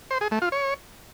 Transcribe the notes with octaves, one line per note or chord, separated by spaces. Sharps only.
C5
G#4
A3
F4
C#5